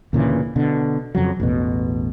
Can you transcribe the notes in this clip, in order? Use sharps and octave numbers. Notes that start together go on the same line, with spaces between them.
D2 A#2 C#3 E3
B2 D3
F2 C#3 F#3
A1 E2 B2